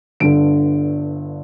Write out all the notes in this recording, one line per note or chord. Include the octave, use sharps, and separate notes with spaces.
G1 G2 D3 D7